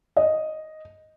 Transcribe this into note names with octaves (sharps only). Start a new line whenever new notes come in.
D#5